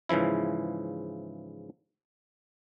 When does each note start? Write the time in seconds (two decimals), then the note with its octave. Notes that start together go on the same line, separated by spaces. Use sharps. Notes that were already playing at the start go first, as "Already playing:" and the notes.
0.09 G#2 C#3 E3 F3 E4